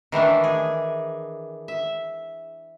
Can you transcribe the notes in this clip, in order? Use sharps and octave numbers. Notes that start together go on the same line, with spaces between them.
D#3 E3 A3 D4
G#4
E5